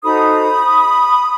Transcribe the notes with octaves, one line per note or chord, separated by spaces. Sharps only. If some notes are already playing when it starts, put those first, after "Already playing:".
D#4 F#4 A4 C5 B5 D#6